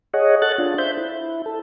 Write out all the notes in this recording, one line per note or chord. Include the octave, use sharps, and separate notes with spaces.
G#4 C#5 D#5 F#5
A4 F#5 F#6 A6
D4 F4
C5 E5 G6
E4
A4